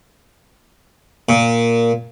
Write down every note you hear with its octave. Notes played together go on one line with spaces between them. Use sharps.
A#2